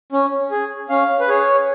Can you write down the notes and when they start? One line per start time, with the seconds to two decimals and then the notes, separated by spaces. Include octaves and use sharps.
0.12 C#4
0.51 G#4
0.89 C#4 F5
1.20 B4
1.28 G#4 C#5